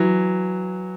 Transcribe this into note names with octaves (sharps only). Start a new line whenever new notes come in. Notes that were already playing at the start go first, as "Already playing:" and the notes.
Already playing: E3 F#3